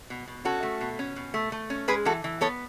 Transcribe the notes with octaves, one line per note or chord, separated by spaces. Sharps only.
B2
B2
C#4 F#4 A4
A3
B2
C#4
B2
A3
A3
C#4
G#3 G#4 B4
E3 F#4 A4
E3
B3 A4 C#5